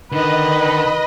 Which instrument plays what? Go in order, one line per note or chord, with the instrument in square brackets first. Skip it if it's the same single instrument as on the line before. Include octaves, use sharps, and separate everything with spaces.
[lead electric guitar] D3 [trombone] D#3 [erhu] B4 [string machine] D#5